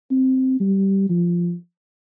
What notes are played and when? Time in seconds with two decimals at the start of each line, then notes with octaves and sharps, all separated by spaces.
0.11 C4
0.60 G3
1.09 F3